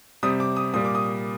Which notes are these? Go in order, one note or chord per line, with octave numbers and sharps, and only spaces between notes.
C3 G3 C4 D#6
D6
D#6
A#2 G3 A#3 D#6
D6
D#6